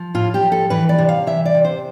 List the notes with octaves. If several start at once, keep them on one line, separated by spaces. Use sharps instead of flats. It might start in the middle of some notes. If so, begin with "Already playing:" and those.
Already playing: F3
A2 F4
G4
F3
A4
E3 B4
D5
C3
F5
E3 E5
D5
C3
C5